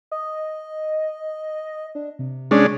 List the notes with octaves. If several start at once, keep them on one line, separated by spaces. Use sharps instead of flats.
D#5
D4
C3
G#3 C#4 D4